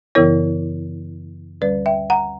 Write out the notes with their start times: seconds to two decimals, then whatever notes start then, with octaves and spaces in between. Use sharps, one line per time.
0.15 F#2 C#3 E3 B3 E4 A#4 C#5
1.61 D2 D3 G3 C#4 B4 D5
1.86 E5 G5
2.10 F#5 A#5